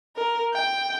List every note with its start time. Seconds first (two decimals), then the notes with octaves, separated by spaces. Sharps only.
0.16 A#4
0.54 G5